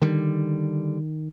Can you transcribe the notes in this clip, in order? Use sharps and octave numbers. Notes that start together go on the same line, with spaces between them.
D3 D#3 G3